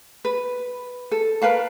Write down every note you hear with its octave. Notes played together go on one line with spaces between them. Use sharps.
B4
A4
A#4 B4 F5 A5